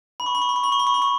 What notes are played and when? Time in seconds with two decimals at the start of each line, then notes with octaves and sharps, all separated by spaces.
0.20 B5
0.26 C#6
0.35 B5
0.42 C#6
0.49 B5
0.56 C#6
0.64 B5
0.72 C#6
0.79 B5
0.87 C#6
0.94 B5
1.02 C#6